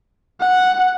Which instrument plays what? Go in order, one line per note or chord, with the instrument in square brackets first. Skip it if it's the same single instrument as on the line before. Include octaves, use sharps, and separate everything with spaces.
[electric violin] F#5